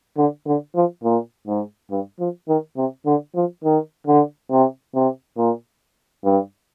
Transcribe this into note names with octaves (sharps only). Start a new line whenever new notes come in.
D3
D3
F3
A#2
G#2
G2
F3
D#3
C3
D3
F3
D#3
D3
C3
C3
A#2
G2